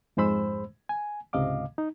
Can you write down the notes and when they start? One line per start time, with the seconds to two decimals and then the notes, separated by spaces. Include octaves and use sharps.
0.17 F2 G#2 G#3 C5 B5 E6
0.89 G#5
1.33 C#2 G#2 C3 D#5 F5 D6
1.78 D#4